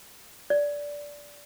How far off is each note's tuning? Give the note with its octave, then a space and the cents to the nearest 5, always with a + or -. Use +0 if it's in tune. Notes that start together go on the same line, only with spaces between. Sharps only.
D5 -10